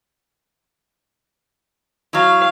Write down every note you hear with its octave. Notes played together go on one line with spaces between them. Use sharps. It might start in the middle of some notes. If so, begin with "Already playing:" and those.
E3 F#3 F5